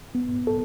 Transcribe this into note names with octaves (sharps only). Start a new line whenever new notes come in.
B3
A4